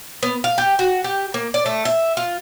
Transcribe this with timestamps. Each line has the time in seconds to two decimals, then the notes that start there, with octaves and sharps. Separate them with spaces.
0.23 B3
0.44 F5
0.58 G4
0.79 F#4
1.04 G4
1.34 A#3
1.54 D5
1.66 A3
1.85 E5
2.17 F4